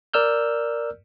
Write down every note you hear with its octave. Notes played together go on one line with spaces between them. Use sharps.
A#4 D5 E6 F6 G6